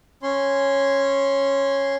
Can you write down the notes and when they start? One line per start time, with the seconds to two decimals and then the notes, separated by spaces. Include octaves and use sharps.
0.23 C#4 C#5 C6